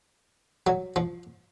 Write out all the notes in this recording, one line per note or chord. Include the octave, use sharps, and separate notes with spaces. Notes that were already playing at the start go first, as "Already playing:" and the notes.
F#3
F3